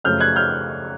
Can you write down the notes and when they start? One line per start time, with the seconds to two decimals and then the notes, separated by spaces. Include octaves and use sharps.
0.04 F#2 C#3 F3 A3 F6 G6
0.20 F#6 G#6
0.36 F6 G6